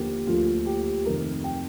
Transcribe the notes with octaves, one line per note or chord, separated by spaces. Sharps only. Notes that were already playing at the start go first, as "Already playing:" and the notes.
Already playing: D#2 D3 F3 A#3 G4
D2 D3 F3 A#3 F4
G4
F2 C3 D#3 A3 A#4
G5